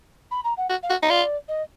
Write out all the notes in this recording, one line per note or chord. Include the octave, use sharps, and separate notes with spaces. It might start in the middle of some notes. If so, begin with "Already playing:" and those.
B5
A#5
F#5
F#4
F5
F#4
D#4
F4 D5
D#5